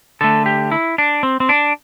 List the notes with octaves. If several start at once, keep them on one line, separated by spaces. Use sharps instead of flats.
D3 A3 A4
G4
E4
D4
C4
C4
D4